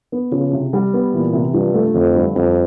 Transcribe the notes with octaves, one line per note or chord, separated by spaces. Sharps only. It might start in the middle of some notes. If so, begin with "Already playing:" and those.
B3
C#3 F3
C3
G3
B3
A#2 E3
C3
G2 F3
A3
F2 D3
G2
F2 G3